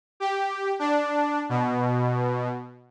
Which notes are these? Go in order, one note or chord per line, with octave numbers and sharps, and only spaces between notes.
G4
D4
B2